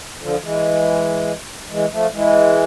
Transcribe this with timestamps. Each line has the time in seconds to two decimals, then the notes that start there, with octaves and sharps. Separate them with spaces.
0.21 D3 F3
0.43 E3 G#3
1.70 E3 G#3
1.92 F3 A3
2.13 E3 G#3